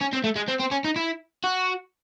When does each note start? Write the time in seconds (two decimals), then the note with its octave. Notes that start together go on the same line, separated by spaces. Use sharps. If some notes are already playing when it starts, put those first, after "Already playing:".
0.01 C#4
0.13 C4
0.24 A3
0.36 G#3
0.48 C4
0.60 C4
0.71 C#4
0.85 D#4
0.96 E4
1.44 F#4